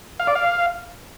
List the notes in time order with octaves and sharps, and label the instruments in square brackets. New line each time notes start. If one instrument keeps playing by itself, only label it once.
[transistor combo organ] F5
D5
F5